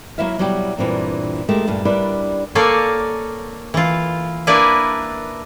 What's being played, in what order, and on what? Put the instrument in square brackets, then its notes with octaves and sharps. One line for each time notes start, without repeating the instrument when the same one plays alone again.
[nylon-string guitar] F#3 A#3 C4 E4 E5 F5
B2 F#3 G3 E4 F#4 G4
G2 A#2 E3 C4 D4
G#3 A3 G4 A#4
G2 A#2 A3 D4
G3 D4 E4 A#4 B4
[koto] A#3 A4 C#5 D5 F5 G#5
E3 F4
A#3 D4 E4 B4 D5 G#5